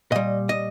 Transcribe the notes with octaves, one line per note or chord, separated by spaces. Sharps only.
A#2 G3 D#5
D#5